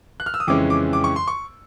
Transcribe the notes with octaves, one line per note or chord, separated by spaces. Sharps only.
F#6
F6
E6
D#6
F2 C#3 E3 G#3 C#4 D6
D6
D6
C#6
C6
C#6